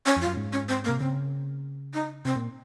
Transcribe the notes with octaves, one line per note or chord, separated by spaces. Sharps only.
C#4
F2 F4
F#2
G#2
C#4
C4
A#3
C3
C#3 C4
D#4
C3 C4
A#2